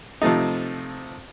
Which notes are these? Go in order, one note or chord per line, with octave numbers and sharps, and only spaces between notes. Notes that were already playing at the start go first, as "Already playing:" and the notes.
C3 F3 A3 D#4